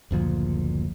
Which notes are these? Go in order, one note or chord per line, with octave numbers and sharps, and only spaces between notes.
F#1 D2 A#2 F3